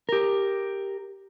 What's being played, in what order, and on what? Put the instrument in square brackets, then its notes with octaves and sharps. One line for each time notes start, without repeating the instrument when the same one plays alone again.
[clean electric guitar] G4 A#4